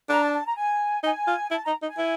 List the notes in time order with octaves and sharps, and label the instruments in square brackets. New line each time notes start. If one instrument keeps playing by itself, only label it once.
[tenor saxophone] D4 [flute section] A#5
[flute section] A5
A5
A#5
G#5
[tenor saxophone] D#4 [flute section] G#5
[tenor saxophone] F4
[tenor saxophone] E4 [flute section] A5
[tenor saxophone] D#4 [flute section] A#5
[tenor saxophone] D#4
[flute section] G#5
[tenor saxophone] E4